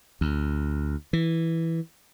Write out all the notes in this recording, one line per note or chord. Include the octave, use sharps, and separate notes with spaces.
D2
E3